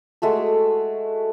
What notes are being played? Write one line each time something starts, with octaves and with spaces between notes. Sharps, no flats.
G#3 A3 F#4 A4